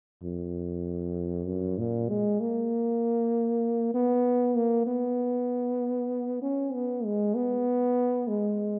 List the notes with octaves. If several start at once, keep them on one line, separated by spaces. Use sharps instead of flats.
F2
F#2
A#2
G#3
A#3
B3
A#3
B3
C#4
B3
G#3
B3
G#3